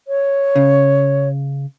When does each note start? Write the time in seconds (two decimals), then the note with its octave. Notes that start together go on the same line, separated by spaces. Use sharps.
0.08 C#5
0.56 C#3